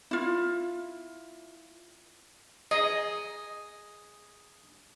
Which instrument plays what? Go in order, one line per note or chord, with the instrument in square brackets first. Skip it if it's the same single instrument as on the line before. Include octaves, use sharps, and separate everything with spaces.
[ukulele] E4 F4
[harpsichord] G#4 [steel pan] D#5